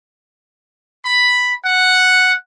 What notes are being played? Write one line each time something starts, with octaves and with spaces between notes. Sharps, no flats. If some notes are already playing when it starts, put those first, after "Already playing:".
B5
F#5